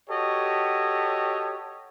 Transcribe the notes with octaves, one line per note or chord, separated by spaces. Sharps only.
F#4 G4 A4 C#5 D#5